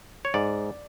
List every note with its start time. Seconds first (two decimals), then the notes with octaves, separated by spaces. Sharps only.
0.25 C#5
0.34 G#2 D5